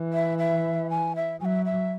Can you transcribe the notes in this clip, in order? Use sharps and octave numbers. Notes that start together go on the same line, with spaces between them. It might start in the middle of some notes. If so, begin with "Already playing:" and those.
Already playing: E3
E5
E5
G#5
E5
F#3 E5 G#5
E5